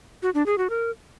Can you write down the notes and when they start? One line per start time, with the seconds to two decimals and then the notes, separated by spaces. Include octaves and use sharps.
0.23 F#4
0.34 D4
0.46 G#4
0.58 F#4
0.70 A#4